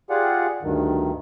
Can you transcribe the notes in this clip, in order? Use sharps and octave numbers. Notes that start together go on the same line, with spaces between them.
F4 G4 G#4 D5 F#5
D2 G2 D#3